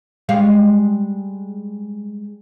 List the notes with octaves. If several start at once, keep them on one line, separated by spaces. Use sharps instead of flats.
G3 G#3 F5